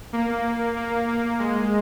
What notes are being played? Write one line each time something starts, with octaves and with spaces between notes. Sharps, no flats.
A#3
A#3
A#3
G#3